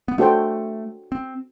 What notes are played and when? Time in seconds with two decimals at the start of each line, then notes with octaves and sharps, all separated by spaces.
0.08 B3
0.18 A3 D4 F#4 A4 C5 G5
1.12 C4